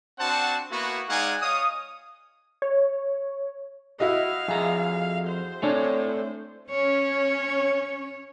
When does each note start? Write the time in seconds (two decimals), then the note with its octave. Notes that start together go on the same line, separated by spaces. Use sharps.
0.19 C4 D4 F#4 C5 F#5 A5
0.71 A#3 B3 E4 F#4
1.09 G#3 D#4 D5 F5 F#5 G#5
1.41 C#5 D#5 F5 D#6
2.62 C#5
4.00 E4 F#4 D#5 F5
4.48 F2 G#4 A#5
5.27 C5
5.62 A3 C4 D4 C#5 G#5
6.70 C#4 C#5